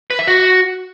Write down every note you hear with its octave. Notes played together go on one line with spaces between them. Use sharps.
B4
E5
F#4